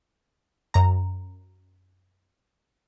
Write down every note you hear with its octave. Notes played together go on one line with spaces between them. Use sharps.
F#2 A#5